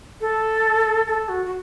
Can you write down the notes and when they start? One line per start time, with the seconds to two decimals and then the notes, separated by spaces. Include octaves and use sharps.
0.21 A4
1.07 A4
1.29 F#4
1.46 F#4